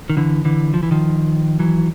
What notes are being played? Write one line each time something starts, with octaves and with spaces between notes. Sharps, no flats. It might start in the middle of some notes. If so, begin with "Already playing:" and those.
D#3
D3 E3
D3 E3
F3
E3
D#3 F3
E3 F#3